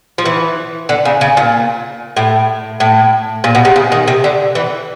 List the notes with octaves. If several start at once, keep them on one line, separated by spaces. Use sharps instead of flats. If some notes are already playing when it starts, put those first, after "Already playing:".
F3
E3
D3
C#3
C#3
A#2
A2
A2
A#2
B2
C3
C#3
D#3
C3
D3
E3